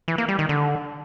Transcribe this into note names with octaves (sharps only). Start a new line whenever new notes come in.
E3
A#3
G3
D#3
D3